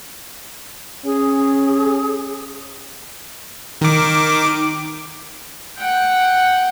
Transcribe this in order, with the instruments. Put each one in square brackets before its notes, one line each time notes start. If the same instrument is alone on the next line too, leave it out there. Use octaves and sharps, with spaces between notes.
[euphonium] C#4 [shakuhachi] G#4
[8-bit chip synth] D#3 D6
[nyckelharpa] F#5 G5